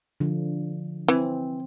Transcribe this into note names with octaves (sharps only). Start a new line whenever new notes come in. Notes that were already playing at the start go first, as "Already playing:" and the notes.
D3 F3
E3 C4